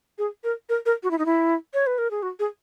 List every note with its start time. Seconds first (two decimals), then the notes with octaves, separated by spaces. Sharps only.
0.18 G#4
0.44 A#4
0.69 A#4
0.86 A#4
1.03 F#4
1.11 E4
1.18 D#4
1.26 E4
1.74 C#5
1.87 B4
1.98 A#4
2.11 G#4
2.23 F#4
2.39 G#4